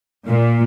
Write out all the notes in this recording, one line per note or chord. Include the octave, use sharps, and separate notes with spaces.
A#2